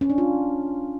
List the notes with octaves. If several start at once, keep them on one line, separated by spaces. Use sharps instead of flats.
C#4
D4
F4